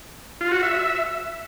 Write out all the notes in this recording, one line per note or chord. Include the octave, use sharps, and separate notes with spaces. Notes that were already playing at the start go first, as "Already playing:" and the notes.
F4
F#4
E5
E5